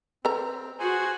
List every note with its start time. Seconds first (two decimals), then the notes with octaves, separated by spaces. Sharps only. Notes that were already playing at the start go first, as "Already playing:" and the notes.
0.25 C4 A4 B4 A#5
0.79 F#4 G#4 C5 G#5